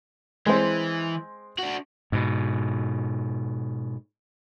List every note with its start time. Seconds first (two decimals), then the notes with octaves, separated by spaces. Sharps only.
0.46 E3 G#3 C4
1.58 D4 F#4
2.12 G#2 B2